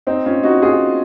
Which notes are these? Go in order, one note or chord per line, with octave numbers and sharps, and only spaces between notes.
C4 D#4
C#4 F4
D#4 F#4
F4 G#4